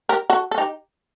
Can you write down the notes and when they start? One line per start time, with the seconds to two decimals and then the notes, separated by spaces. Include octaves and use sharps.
0.09 G4 A#4
0.30 F#4 A4
0.51 A4
0.58 D#4 G4